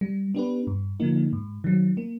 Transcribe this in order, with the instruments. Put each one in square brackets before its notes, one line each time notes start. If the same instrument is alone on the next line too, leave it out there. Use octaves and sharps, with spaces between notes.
[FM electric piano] G3
B3 D4 G4 B4
G2
D3 F3 A#3 D#4
G#2
D#3 F#3
A#3